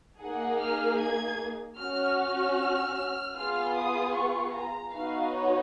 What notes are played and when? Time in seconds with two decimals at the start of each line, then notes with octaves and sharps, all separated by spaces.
0.20 A#3 D#4 G#4 F#5
0.60 F6
0.98 G#6
1.78 C#4 F#4 F6
2.18 F6
3.35 B3 F4 G#4 F6
3.75 D#6
4.14 C#6
4.52 A#5
4.92 B3 D#4 F#4 F5
5.31 C#5